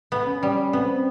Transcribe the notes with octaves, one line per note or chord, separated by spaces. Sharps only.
B3
C#4
G3
B3 C4